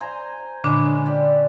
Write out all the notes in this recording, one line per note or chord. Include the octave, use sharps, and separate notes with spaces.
C5 G#5 A#5
A#2 D3 G#3 C#4 D4 B4
G4 D5